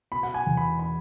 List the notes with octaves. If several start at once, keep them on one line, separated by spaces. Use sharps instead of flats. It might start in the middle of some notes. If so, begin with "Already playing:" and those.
B2 B5
F#5
G#5
E2
B5
B5